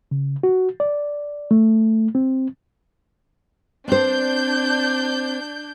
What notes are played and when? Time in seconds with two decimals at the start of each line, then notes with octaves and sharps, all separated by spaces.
0.11 C#3
0.43 F#4
0.80 D5
1.51 A3
2.15 C4
3.88 C4 D4 C5 G6